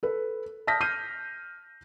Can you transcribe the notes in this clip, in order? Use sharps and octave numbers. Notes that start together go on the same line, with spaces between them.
A4 B4
A5 D#6 F6 G6 A#6 B6
F6 G6 C7 D#7